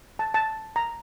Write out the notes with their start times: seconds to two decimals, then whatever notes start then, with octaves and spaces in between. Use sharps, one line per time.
0.19 A5
0.34 A5
0.76 A#5